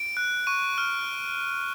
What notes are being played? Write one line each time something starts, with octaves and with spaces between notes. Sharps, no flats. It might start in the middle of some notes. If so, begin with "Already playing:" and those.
Already playing: D7
F#6
C#6 D#7
F6